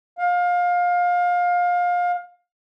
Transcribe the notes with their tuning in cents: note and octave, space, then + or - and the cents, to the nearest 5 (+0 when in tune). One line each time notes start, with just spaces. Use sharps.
F5 +25